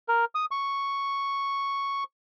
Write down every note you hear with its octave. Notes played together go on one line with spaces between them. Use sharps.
A#4
D#6
C#6